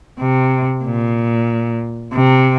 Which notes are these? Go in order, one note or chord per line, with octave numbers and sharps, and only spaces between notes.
C3
A#2
C3